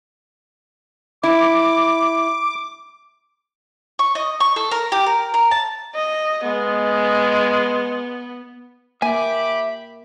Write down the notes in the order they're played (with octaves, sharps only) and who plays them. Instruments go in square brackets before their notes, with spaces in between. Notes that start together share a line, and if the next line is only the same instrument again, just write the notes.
[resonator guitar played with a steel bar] E4 [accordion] D6
[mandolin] C#6
D#5
C#6
A4
A#4
G4
A#4
A#4
A5
[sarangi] D#5
[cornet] G#3 [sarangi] B3
[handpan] A#3 [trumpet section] G4 B5 D6 [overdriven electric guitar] E5 [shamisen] G#5